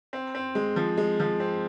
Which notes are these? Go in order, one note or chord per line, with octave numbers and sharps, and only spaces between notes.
C4
C4
G#3
F3
G#3
F3
C4